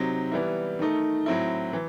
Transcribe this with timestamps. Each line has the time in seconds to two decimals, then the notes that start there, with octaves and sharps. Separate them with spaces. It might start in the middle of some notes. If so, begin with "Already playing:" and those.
Already playing: C3 F#3 C4 D#4
0.32 E3 G3 B3 E4
0.79 D#3 A3 D#4
1.26 A2 F#3 C4 E4
1.73 E3